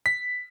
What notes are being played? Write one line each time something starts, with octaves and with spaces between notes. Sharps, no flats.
B6